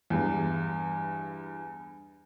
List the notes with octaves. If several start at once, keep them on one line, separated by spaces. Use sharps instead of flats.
E2 G2